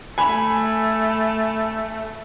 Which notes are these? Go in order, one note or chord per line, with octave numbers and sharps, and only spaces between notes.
A3 G#5 B5